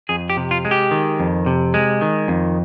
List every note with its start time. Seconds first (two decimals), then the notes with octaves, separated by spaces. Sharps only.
0.09 F2 G#4
0.30 G4
0.37 C3
0.51 F4
0.65 G#3
0.71 G4
0.91 D#3
1.20 F2
1.46 C3
1.74 G#3
2.01 D#3
2.28 F2